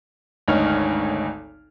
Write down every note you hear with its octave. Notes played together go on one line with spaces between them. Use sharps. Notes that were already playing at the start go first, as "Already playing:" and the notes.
G#1 D2 D#4 C#5 F6